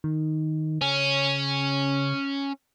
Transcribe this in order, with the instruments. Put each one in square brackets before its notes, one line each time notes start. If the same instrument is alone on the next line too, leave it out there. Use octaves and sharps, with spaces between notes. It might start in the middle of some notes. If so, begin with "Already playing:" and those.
[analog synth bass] D#3
[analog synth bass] C#3 [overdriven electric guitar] C#4